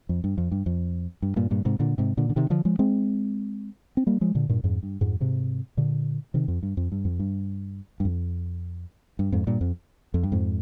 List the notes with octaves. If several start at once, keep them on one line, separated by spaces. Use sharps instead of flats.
F2
G2
F2
G2
F2
G2
G2 A#2
G2 A#2
G#2 C3
A#2 D3
G#2 C3
A#2 D3
D3
C3 D#3
D3 F3
F3 G#3
G#3 C4
C4
G3 A#3
F3 G#3
A#2 D3
G2 A#2
F2 G#2
G2
F2 G#2
G#2 C3
A#2 D3
C3 D#3
F2
G2
F2
G2
F2
G2
G2
F2
G2
F2 G#2
G2 A#2
F2
F2
G2
F2 G#2